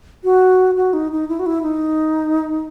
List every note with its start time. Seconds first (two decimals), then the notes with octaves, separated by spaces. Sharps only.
0.24 F#4
0.76 F#4
0.93 D#4
1.12 D#4
1.29 E4
1.39 F#4
1.46 E4
1.63 D#4